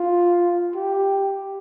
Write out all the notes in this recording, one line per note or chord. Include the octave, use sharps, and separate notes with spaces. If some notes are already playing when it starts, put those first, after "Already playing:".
Already playing: F4
G4